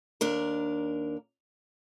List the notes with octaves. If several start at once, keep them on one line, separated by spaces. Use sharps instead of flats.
D#2 D4 A#4